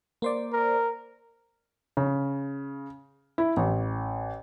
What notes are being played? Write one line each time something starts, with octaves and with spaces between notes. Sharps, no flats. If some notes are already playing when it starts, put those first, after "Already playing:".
A#3 C5 D5
A#4
C#3
E4
A1